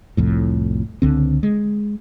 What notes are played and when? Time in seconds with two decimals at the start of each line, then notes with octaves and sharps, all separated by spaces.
0.17 C2 F2 A2
1.02 C#2 D3 C4
1.43 G#3